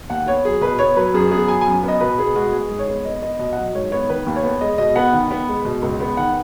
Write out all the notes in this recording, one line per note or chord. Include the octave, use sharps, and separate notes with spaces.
D#2 F#5
B3 C#5
F#3 G#4
B2 B4
B3 C#5
F#3 B4
F#2 G#4
B3 G#4
F#3 G#5
G#5
F#2
B3 D#5
B2 B4
B3 G#4
G#3 F#4
G#3 G#4
G#2
C#5
B3
B3 D#5
B3 D#5
B2 D#5
F#5
F#3 D#5
G#2 C#5
B3 C#5
D#3 B4
D#2
C#5
B3
G#3 D#5
B2 D#5
B3 F#5
D#3
B3
G#3
B2
C#2
B3
D#3 F#5